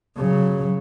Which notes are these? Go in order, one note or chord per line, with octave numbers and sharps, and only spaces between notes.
C#3 F#3